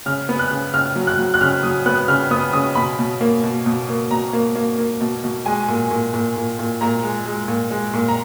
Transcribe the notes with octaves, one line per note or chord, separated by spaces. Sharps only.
C#3 F6
B3
F#6
C#3
C#3 F6
F#3
F#6
F#3
F#6
C#3 F6
F#3 D#6
B3 F#6
C#3 F6
B3 D#6
C#3 D#6
B2 B5
B2
A#3
B2
B2
A#3
B2 A#5
A#3
A#3
A#3
B2
B2
G#3 G#5
A#2
A#2
A#2
A#2
A#2
A#2 A#5
G#3
G#3
A#2
G#3
A#2
A#5